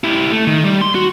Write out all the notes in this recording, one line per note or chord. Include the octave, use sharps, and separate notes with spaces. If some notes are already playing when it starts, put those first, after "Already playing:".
E4 G4
A3
D#3
G3
C6
F#4